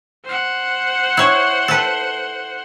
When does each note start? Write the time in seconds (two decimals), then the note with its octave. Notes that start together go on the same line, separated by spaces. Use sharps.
0.25 C5 F#5
1.17 E4 C#5
1.68 A4 B4